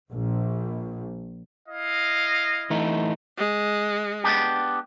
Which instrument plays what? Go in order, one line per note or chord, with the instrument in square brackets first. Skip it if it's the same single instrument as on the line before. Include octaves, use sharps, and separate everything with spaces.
[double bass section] A#1
[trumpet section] E4 D#5 F5
[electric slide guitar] E3 A3 D#4
[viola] G#3
[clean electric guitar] B3 D4 G4